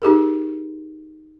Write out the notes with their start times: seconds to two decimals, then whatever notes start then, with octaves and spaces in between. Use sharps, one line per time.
0.02 D#4 G4 G#4 A#4